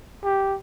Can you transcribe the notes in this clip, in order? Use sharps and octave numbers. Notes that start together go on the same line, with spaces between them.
G4